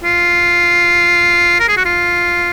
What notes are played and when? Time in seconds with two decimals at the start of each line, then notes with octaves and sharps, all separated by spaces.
0.03 F4
1.60 A#4
1.68 G#4
1.77 F#4
1.85 F4